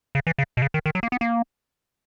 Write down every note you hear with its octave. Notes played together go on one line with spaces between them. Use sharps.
C#3
E3
C#3
B2
C#3
D#3
D#3
F#3
A#3
B3
A#3